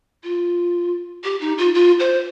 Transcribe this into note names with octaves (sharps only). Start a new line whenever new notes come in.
F4
G4
D#4
F4
F4
C5